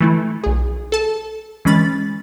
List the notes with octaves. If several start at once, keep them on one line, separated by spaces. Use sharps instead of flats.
E3 A3 E4
B1 G#4
A4 A5
E3 G#3 C#4 B5 A6